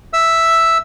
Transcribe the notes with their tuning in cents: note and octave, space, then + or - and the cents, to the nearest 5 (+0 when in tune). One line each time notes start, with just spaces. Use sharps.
E5 +0 E6 +0